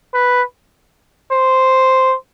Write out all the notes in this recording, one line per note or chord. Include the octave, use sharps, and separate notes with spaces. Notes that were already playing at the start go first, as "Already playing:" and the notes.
B4
C5